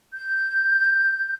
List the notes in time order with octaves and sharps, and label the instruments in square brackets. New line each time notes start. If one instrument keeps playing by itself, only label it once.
[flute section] G6